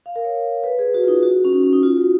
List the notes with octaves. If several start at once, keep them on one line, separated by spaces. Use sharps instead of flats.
F5
A#4
C#5
B4
G#4
F#4
F4
D#4
F#4
C#4
D#4
C#4
D#4
F4
F#4